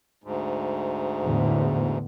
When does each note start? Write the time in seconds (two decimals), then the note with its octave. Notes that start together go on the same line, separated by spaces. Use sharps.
0.24 D2 G#2
1.23 E2 A2 D3